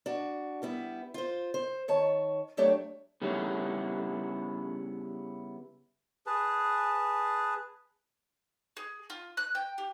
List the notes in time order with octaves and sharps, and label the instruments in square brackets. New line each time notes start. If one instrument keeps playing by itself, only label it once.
[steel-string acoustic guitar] D4 F#4
G3 B3 E4
F4 C5
C5
D#3 C#5 A5
F#3 A3 D4 G4 C#5 D5
[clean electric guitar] C#3 G3 B3 C#4 E4
[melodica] G#4 B4 A5
[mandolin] G#4
F4
F#6
G5
G4